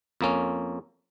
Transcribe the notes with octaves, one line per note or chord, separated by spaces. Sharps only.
F2 A#3 C#4